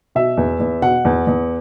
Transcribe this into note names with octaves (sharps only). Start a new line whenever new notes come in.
B2 E5
E2
E2
B2 F#5
E2
E2